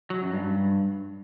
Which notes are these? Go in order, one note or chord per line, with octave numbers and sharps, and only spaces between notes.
F#3
F#2
G2